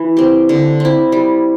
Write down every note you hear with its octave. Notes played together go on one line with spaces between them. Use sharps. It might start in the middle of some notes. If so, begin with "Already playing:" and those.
Already playing: E3 E4
C4 G4
D3
C4 E4
G3